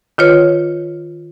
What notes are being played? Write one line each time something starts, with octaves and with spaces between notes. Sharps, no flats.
D#3 F4 B4 C#5